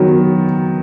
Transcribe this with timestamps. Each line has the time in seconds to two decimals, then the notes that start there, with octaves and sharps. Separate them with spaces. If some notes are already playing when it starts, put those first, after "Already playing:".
Already playing: D#3 F#3 B3